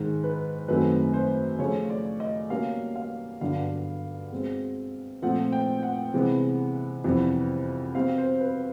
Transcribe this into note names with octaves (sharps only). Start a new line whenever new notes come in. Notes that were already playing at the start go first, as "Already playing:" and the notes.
Already playing: G#2 D#3 G#3
B4
F#2 D#3 F#3 A3 C4 B4
C5
C#3 F3 A3 C#5
D5
D#5
B2 G3 A#3 C#4 F5
F5
G2 D3 F#3 B3 D4 F5
B2 G#3 C4
A#2 F3 A3 C4 F#5
G5
F#5
C3 E3 G#3 B3
F2 C3 E3 G3 B3
B2 G3 C4 F5
C5
B4